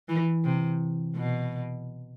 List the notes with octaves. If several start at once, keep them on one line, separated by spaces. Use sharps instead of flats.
E3
C3
B2